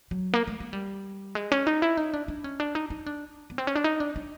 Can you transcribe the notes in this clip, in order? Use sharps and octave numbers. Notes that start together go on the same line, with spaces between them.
F#3
A#3
A3
G#3
G3
G#3
C#4
D#4
E4
D#4
D4
D4
C#4
D4
D#4
D#4
D4
B3
C4
C#4
D4
D#4
D4
D4